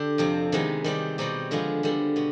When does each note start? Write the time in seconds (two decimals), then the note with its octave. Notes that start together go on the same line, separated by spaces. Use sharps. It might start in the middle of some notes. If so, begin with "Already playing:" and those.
Already playing: D3 D4 G4
0.18 F2 C3 F3 C4
0.52 C3 D#3 G#3 B3 D#4
0.84 D#3 G3 C4 G4
1.18 B2 G3 C4 D#4 G4
1.51 D3 F3 G#3 B3 F4
1.83 D3 G3 B3
2.16 B2 B3